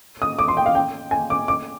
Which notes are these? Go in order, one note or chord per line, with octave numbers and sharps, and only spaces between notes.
D#6
D6
C6
G5
F5
G5
G#5
D6
D6